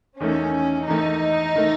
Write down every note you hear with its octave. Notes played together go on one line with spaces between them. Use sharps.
E2 D#3 A3 C#4
E2 D#3 A3 D#4
D#3 A3